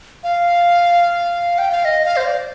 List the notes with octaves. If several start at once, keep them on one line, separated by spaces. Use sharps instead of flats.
F5
G5
F5
D#5
F5
C5
D5